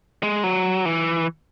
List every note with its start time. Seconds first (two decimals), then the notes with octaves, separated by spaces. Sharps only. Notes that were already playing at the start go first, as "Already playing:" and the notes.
0.23 G#3
0.44 F#3
0.85 E3